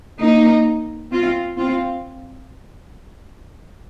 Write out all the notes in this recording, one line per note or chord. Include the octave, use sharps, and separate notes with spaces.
A#3 D#4
C4 F4
C4 F4